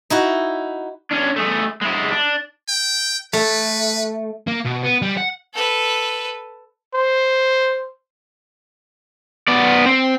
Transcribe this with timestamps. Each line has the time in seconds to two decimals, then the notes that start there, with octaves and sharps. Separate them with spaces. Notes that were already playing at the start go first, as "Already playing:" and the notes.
0.10 D#4 E4 F#4
1.11 C#4 D4
1.36 A3 G#4
1.81 G#3 E4
2.11 D4
2.69 G5
3.33 A3 B4
4.48 A#3
4.65 B2
4.83 B3
5.02 G3
5.17 F#5
5.54 A4 B4
6.94 C5
9.48 B3 D5
9.86 C4